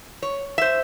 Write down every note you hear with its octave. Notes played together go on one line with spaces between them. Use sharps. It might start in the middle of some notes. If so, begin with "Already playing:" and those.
C#5
C5 E5